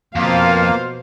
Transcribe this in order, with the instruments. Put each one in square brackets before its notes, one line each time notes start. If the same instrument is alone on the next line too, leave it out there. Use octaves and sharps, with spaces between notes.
[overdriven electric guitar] F2 [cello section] B2 C5 F5 [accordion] A#3 [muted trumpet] F4